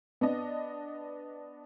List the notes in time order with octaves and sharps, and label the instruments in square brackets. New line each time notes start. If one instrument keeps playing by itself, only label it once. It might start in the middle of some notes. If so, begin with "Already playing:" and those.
[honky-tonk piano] B3 D4 D#5